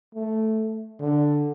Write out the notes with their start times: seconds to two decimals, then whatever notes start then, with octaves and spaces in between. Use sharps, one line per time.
0.15 A3
1.01 D3